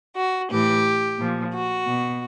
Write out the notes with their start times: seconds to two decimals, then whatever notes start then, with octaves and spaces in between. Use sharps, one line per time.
0.16 F#4
0.49 A2 E3 G4
1.18 A#2 F3
1.52 F#4
1.87 B2